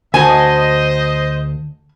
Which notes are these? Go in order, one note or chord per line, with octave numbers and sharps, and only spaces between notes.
D2 F#4 C5 D#5 G#5 A5